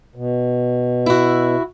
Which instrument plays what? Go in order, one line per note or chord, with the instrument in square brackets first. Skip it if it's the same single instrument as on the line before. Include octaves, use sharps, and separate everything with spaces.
[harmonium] B2
[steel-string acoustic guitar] E4 F#4